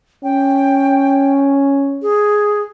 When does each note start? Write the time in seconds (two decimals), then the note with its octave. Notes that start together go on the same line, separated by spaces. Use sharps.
0.24 C#4 G5
2.02 G#4